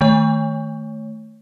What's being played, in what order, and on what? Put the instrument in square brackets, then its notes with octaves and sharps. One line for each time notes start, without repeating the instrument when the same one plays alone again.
[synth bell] D#3 A3 C#5